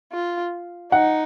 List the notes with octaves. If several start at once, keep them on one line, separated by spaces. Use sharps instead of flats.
F4
D#4 F#5